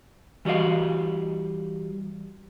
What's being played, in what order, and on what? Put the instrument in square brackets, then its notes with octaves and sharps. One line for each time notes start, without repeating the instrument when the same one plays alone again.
[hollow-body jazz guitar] E3 G3 F#4 D#5 F5